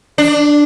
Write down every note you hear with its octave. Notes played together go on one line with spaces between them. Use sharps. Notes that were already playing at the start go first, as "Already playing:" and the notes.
D4